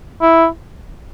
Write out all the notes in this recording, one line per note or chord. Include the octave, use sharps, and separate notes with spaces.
E4